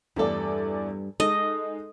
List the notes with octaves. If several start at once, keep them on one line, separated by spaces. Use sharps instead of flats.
E2 G2 G3 A3 A4 D5
G#3 D#4 A4 D#5